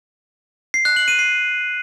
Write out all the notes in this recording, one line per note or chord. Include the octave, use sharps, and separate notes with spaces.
C7
F#6
F#7
D#7
C7